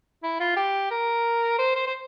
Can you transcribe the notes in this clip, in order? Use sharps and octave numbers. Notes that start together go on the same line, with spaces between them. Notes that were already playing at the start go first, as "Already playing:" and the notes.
E4
F4
G4
A#4
C5
C5
C5